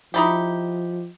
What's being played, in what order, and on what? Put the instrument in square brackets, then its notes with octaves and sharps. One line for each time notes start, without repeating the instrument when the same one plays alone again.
[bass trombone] F3 [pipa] D#4 E4 G4